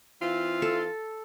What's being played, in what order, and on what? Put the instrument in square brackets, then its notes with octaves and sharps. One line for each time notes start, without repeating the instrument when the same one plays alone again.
[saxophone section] E3 C4 F4
[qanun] A4